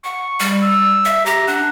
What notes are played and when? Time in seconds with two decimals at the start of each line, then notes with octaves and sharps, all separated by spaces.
0.04 F#5 C#6
0.40 G3
0.62 E6
1.05 E5
1.26 G4 A#5
1.47 D4 F#5